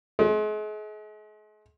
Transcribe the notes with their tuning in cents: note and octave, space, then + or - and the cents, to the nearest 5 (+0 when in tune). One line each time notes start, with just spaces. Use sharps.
G#3 +40